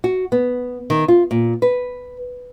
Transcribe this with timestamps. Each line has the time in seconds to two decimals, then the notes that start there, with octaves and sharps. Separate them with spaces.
0.04 F#4
0.32 B3
0.90 D#3
1.08 F4
1.31 A#2
1.62 B4